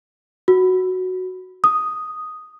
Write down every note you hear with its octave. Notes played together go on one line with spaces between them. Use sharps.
F#4
D#6